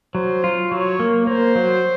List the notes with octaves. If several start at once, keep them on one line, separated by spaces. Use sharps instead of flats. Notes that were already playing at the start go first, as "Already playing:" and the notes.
F#3 C5
F4
F#3 C#5
A#3
A#3 C5
F#3